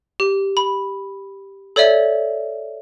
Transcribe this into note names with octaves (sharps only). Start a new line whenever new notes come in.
G4
B5
A4 C#5 D5 E5